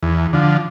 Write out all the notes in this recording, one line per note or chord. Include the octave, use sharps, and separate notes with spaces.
E2
D3 F3